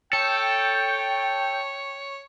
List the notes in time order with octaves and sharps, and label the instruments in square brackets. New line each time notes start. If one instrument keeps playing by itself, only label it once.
[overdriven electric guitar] A4 [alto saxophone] C#5 [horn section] G5